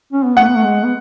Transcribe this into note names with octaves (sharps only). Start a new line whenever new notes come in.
C#4
B3
A3 F#5
B3
A3
G#3
B3